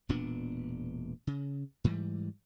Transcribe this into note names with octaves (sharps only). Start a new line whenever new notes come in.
E1 A#2 B3 D4
C#3
G#2 E3 G3